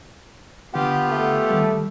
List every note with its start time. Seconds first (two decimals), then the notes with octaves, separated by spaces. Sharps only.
0.74 D3 B3 F4 G4 F#5
1.09 A3
1.50 D#3 G3